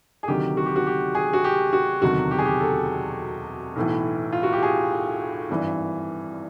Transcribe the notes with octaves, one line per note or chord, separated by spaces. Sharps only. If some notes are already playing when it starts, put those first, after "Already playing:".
G#4
D2 C3 D#3 F#3 G4
F#4
G4
F#4
G4
G#4
F#4
G4
F#4
E1 D2 C3 D#3 F#3 F#4
G4
G#4
G4
A4
B1 A2 E3
F4
F#4
G4
G#4
G#1 G2 E3